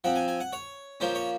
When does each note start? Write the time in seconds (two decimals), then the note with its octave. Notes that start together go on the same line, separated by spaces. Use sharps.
0.04 F3 C4 F#5
0.16 G#5
0.28 G#5
0.40 F#5
0.53 C#5
1.00 F3 A#3 C#4 C5
1.15 C#5